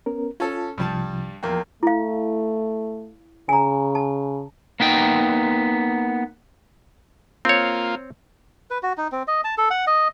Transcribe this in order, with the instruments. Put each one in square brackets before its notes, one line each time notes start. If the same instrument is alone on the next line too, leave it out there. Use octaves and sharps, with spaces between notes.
[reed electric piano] B3 C#4 A#4
[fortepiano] C#4 A4 [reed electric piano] F4 A5
[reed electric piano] C2 C3 F3 [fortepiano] G2 G3 A5
[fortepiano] E2 A#3 [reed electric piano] F3 A#4 G5
[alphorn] A3 [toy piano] E4 F5
[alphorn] C#3 [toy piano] G#5 A#5
[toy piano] A5
[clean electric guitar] A#3 B3 D#4 G5
[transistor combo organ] A#3 F4 [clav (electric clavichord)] C4 C#5
[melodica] B4
F#4
D#4
C4
D#5
A5
A4
F#5
D#5